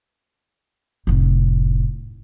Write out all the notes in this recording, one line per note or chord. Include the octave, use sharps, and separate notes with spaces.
F1 A2